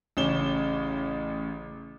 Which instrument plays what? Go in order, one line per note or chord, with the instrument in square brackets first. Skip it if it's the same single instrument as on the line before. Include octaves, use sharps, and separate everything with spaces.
[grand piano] A1 C#3 C#4 E7 G7